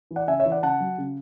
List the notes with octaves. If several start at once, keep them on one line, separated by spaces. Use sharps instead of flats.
E3
D5 F#5
C#3 E5 G#5
C#5 E5
E3
D5 F#5
C#3 F#5 A5
F#3
C#3